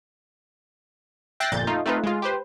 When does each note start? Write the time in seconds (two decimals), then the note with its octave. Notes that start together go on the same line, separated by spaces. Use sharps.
1.40 E5 G5 F#6 A6 A#6 C7
1.52 G1 F2 A#2 G6 A6
1.67 A3 D#4 F4
1.86 A3 C4 D#4 F4 B4
2.03 G#3 F4
2.22 G4 B4 C5